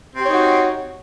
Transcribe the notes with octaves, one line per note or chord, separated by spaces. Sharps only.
C4 D#4 F#4 G4 C#5